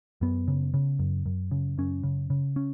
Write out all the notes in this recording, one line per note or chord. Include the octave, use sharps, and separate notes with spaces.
F#2 B3
C#3
C#3
F#2
F#2
C#3
F#2 C#4
C#3
C#3
C#4